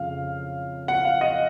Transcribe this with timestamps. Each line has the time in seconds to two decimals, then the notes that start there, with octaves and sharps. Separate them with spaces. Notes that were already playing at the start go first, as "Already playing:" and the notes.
Already playing: F2 C#3 F3 F5
0.88 F#5
1.05 F5
1.21 D#5